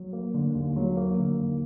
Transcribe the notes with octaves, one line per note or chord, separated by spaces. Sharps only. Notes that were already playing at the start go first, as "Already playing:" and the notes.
Already playing: F#3
A#3
D3
D#2
F#3
A#3
D3
D#2